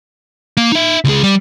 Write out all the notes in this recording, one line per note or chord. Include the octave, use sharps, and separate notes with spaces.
A#3
D#4 E5
C#2 G#4
G3